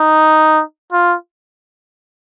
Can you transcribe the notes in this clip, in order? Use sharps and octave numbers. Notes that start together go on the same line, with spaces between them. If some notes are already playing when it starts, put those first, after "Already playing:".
Already playing: D#4
F4